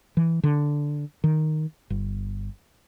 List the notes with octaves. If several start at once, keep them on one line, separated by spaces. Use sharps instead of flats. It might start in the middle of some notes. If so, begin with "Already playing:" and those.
E3
D3
D#3
G1